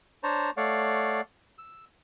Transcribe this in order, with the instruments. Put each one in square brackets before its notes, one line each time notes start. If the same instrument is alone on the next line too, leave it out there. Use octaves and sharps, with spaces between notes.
[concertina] D4 C5 C#5 A5 A#5
A3 C#5 D5 F5 F#5
E6